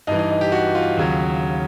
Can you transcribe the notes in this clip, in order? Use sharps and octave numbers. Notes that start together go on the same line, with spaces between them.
G2 E3 D#4
D#4
D#4
G4
F#4
F4
D#2 C#3 F#3